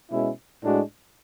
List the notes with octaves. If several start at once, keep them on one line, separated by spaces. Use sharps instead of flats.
B2 G#3 C#4 E4
A2 G#3 D4 F#4